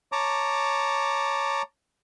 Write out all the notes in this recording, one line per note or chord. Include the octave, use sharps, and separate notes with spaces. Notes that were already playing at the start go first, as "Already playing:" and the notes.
C#5 A5 A#5 D6